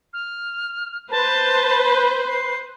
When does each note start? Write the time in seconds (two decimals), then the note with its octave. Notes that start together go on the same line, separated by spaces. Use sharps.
0.13 F6
1.11 B4 C5 A5
2.28 C7